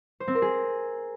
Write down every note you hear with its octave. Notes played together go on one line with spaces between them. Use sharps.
C5
C4
A#4
G#4